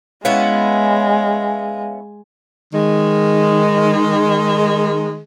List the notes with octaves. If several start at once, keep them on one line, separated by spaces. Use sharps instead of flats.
G#3 B3 C#4 E4 F5
D#3 G#3